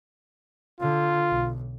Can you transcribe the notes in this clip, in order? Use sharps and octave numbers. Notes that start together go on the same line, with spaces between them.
D3 F4
B1